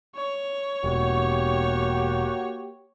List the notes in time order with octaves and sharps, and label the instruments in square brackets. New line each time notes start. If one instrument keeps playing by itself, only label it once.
[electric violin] C#5
[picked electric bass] E1 [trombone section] A#3 F#4 G4